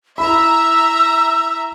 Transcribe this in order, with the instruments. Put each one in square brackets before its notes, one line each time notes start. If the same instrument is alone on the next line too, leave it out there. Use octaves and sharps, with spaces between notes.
[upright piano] E4 B5 [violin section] E5 A#5 [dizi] E6